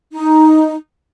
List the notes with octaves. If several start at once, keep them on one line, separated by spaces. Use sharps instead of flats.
D#4